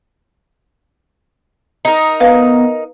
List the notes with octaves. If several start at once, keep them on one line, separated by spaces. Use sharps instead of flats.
D#4 A#4
B3 B4 F5